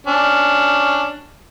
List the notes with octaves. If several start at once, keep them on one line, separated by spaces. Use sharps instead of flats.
C#4 D4